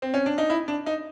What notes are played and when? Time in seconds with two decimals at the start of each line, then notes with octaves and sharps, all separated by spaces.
0.02 C4
0.14 C#4
0.26 D4
0.38 D#4
0.50 E4
0.68 D4
0.86 D#4